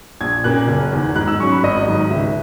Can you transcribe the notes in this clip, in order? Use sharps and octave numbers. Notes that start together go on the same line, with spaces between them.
A#1 G#6
A#2 A#3 C#4 F#6
F#1
E2 D#3
G#2 F#6
E6
F#3 C#4 C#6
B5
G#1 D#5
G#2 D#3 F#3
C#2 E5